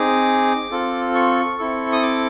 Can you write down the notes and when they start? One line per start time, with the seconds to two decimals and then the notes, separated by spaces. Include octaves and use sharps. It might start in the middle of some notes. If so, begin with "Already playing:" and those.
Already playing: C4 D#4 G#4 D6
0.71 C4 F4 A4
1.15 C#6
1.59 C4 E4 A4
1.92 D#6
2.02 D6